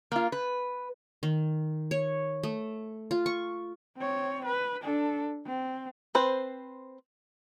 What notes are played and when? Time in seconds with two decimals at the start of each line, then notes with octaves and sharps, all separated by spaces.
0.12 A#3 F4
0.32 B4
1.23 D#3
1.91 C#5
2.43 A3
3.11 F4
3.26 C#6
3.98 C4 C#5
4.46 B4
4.82 D4 A4
5.46 C4
6.15 C4 B4 C5